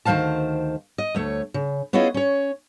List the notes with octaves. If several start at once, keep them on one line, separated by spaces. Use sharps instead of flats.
D2 D#3 G#3 C5 F5 A5
D#5
D2 A3 C#5
C#3
B3 C#4 E4 F4 G#4 D#5
C#4 C#5